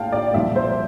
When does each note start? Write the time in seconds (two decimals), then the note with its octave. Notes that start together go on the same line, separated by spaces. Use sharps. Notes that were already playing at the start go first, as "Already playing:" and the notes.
Already playing: A#1 A2 F5 G5 A5
0.12 D5
0.34 C2 A#2 F3 E5
0.56 C5